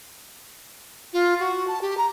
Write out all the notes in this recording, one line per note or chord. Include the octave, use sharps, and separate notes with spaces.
F4
F#4
A5
G4
A#5